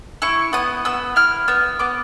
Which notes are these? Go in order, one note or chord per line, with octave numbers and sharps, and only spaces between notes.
E4 C#6
B3 D#6
B3 E6
E4 F6
B3 E6
B3 D6